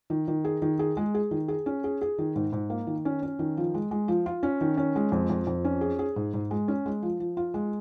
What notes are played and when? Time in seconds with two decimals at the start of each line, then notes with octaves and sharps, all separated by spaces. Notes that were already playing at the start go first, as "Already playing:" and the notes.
0.10 D#3
0.28 D#3
0.45 G#4
0.62 D#3
0.79 G#4
0.97 G#3
1.14 G#4
1.31 D#3
1.48 G#4
1.66 C#4
1.84 G#4
2.01 G#4
2.18 D#3
2.36 G#2
2.52 G#2
2.70 A#3
2.87 D#3
3.05 C#4
3.23 C#4
3.39 D#3
3.57 F3
3.74 G#3
3.91 G#3
4.08 F3
4.26 F4
4.43 C#4
4.61 D#3
4.77 C#4
4.96 G#3
5.12 F2
5.30 F2
5.47 F2
5.65 C#4
5.81 G#4
5.99 G#4
6.16 G#2
6.34 G#2
6.51 G#3
6.68 C#4
6.86 G#3
7.02 F3
7.20 F3
7.37 F4
7.54 G#3